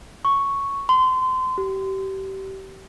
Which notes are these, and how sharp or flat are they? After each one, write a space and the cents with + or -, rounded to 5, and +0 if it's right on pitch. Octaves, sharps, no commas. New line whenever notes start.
C#6 +0
C6 -30
G4 -30